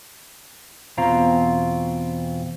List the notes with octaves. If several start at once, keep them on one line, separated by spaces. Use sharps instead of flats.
E2 B2 C4 F4 A#5